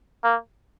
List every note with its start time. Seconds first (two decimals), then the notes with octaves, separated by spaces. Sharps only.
0.24 A#3